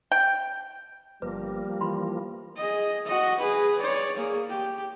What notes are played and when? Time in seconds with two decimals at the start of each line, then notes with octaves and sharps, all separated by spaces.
0.12 G5
1.22 G1 F3 G3 A#3 B4
1.81 E3 F4 B5 C6
2.56 G#4 D#5
3.06 F#4 D#5
3.40 G#4 B4
3.80 C#5 D5
4.17 A#3 G#4
4.49 G4